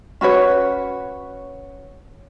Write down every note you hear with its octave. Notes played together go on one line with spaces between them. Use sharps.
C#4 F#4 B4 C#5